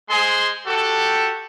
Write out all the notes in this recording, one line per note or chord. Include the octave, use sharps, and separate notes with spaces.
G#3 G#4 C5 C6
F#4 G4 A4